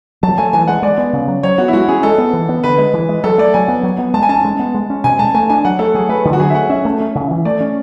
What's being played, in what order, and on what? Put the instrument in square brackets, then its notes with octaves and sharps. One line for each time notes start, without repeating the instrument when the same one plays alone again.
[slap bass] F#3 [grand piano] A5
[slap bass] A3 [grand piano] G#5
[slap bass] E3 [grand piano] G#5
[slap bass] G#3 [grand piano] F#5
[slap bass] G#3 [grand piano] D5
[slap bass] B3
C#3
F#3
[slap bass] F#3 [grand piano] C#5
[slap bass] B3 [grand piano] F#4
[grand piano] E4
[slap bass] G#3 [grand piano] F#4
[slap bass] C#4 [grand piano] G#4
[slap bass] G#3 [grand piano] A4
[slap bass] B3
E3
B3
[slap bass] D3 [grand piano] B4
[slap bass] G#3
E3
G#3
[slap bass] F#3 [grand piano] A4
[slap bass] A3 [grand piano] D5
[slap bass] F#3 [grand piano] G#5
[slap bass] B3
F#3
B3
[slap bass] G#3 [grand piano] A5
[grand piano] G#5
[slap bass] C#4 [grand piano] A5
[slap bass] G#3
B3
G#3
C#4
[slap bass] B2 [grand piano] G#5
[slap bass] G#3 [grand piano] A5
[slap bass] A3 [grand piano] G#5
[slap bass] D4 [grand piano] G#5
[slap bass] F#3 [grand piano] F#5
[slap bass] A3 [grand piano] A4
[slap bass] F#3 [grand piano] G#4
[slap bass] A3 [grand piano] B4
[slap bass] D3
[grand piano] F#4
[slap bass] F#3 [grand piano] G#4
[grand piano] E5
[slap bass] A3 [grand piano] F#5
[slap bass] C#4 [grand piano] E5
[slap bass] A3
C#4
C#3
E3
[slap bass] A3 [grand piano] D5
[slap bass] C#4